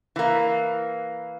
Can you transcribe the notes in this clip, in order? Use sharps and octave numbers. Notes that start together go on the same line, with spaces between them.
E3 A#3